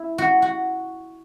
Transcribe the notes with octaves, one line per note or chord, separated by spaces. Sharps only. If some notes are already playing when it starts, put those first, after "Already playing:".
Already playing: E4
F#4
F#4